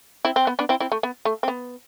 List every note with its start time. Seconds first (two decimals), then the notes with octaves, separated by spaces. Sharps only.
0.25 C4 E4
0.36 C4
0.47 B3
0.59 B3 D4
0.69 C4 E4
0.80 C4 E4
0.92 A3
1.03 B3
1.25 A3
1.43 C4
1.48 B3